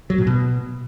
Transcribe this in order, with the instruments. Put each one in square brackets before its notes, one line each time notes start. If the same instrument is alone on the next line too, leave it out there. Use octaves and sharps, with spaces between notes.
[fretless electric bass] F#3
A#2
B2